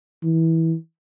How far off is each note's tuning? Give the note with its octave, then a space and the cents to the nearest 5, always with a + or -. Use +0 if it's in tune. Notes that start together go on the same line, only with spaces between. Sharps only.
E3 -20